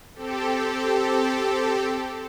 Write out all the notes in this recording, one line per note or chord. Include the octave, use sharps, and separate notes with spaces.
C4 G4 A4